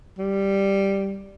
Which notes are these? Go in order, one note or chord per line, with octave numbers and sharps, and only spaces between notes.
G3